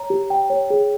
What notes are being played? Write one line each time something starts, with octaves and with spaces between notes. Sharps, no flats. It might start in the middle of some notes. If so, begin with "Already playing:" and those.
Already playing: C#5 A#5
G4
G5
C#5
G#4